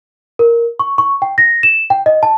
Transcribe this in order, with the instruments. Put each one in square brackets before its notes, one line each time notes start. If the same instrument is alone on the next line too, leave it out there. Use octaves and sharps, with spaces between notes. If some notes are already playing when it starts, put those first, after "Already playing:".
[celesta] A#4
C#6
C#6
G5
A#6
E7
G5
D#5
A5